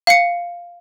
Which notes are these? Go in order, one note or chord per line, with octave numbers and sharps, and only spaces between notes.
F5 C#7